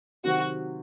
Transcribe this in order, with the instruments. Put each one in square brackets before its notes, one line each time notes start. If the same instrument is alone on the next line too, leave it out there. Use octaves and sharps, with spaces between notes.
[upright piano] C3 D#3 F#3 C4 [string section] F#4